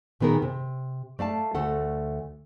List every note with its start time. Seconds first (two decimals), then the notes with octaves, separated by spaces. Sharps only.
0.20 A#2 D#3 B3 G#4 A#4
0.42 C3
1.19 A3 D5 F5 A5
1.55 D2 A3 A4 F#5